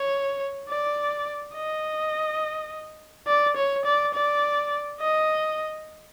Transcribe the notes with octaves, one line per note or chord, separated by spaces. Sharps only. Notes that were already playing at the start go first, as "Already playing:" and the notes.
Already playing: C#5
D5
D#5
D5
C#5
D5
D5
D#5